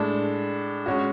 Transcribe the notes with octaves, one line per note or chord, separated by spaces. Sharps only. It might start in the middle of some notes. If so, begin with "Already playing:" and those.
Already playing: A2 G#3 D4
G#3 C#4 F#4